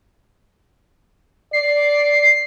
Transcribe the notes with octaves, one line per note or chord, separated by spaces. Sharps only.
D5 C7